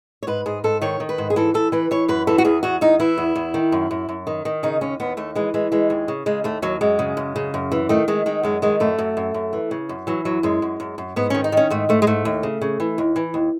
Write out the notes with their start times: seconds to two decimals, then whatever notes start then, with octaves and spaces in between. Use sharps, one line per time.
0.23 C#5
0.27 G#2 B4
0.46 G#2 G#4
0.64 G#2 A4
0.82 D#3 C#5
1.00 D#3
1.09 B4
1.18 G#2
1.30 G#4
1.36 E3 A4
1.54 E3 A4
1.72 E3 B4
1.91 E3 C#5
2.08 F#2 B4
2.27 E3 A4
2.38 F#4
2.45 E2 G#4
2.63 E2 F#4
2.81 E2 D#4
3.00 E3 E4
3.18 E2
3.36 E2
3.54 D#3
3.72 F#2
3.91 F#2
4.09 F#2
4.27 D#3
4.45 D#3
4.63 C#3 D#4
4.81 D#2 C#4
5.00 D#2 B3
5.17 D#2 A3
5.35 E3 G#3
5.54 E3 G#3
5.72 E3 G#3
5.90 D#2
6.08 C#3
6.26 C#3 G#3
6.44 D#2 A3
6.62 D#2 F#3
6.81 F#2 G#3
6.99 C#3
7.17 F#2
7.36 C#3
7.54 F#2
7.72 E3
7.89 D#3 A3
8.08 D#3 G#3
8.26 D#3 G#3
8.43 F#2 G#3
8.62 D#3 G#3
8.80 F#2 A3
8.98 F#2
9.17 F#2
9.34 F#2
9.53 E3
9.71 C#3
9.89 F#2
10.07 E3 F#3
10.25 F#2 F#3
10.43 F#2 G#3
10.62 F#2
10.80 F#2
10.98 F#2
11.16 G#2 B3
11.30 D#3 C#4
11.44 D#4
11.52 D#3 C#4
11.70 G#2 A3
11.89 G#2 A3
12.02 G#3
12.07 G#2 A3
12.25 D#2
12.43 C#3
12.61 C#3
12.80 E3
12.98 D#2
13.16 E3
13.34 D#2